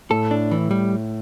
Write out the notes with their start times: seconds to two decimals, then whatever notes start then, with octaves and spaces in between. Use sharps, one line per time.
0.10 A2 A4
0.31 D4
0.51 E3
0.71 G3